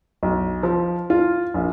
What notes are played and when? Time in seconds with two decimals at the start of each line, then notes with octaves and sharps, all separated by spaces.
0.23 B1
0.63 F3
1.10 F4
1.54 A#1